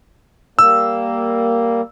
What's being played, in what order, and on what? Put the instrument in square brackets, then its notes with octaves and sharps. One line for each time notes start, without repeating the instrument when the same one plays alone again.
[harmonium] G3 A#3 [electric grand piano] E6